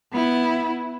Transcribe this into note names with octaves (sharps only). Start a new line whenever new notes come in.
B3 E4